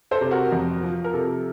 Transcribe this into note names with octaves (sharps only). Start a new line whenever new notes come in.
A4 C5
C3
F#4 A#4
F2
F3
A#4
C3 A4